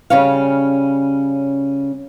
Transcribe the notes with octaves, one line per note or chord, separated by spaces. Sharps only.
C#3 G3 C#4 C#5 F5